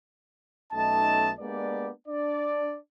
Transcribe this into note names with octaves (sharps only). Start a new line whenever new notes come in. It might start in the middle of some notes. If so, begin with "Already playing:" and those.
B1 A3 C#4 D#4 D#5 A5
G#3 A#3 B3 D4 G4 D5
D4 D5